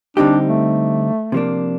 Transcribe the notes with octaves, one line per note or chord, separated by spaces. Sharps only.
D3 G3 C4 D4 D#4 G4
A3
C3 F3 A#3 D4